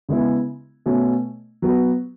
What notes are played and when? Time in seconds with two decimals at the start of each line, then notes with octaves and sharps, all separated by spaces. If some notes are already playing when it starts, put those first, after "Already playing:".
0.09 C#3 G#3 B3 E4
0.86 B2 A3 C#4
1.62 F#3 B3 F#4